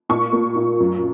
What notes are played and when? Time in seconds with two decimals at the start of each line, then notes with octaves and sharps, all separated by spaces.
0.09 A#2 C#6
0.33 A#3
0.56 A#2
0.80 F#2